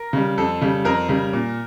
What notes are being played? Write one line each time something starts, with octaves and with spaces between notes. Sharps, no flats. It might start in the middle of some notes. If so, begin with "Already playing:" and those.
Already playing: A#4
C#3 G3
F2 A4
C#3 G3
F2 A#4
C#3 G3
A#2